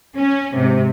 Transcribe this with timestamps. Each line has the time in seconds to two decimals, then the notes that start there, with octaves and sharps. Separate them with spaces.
0.17 C#4
0.56 G#2 C3